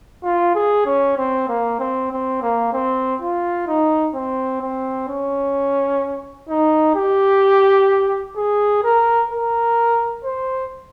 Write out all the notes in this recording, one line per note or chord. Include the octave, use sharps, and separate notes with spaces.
F4
G#4
C#4
C4
A#3
C4
C4
A#3
C4
F4
D#4
C4
C4
C#4
D#4
G4
G#4
A#4
A#4
C5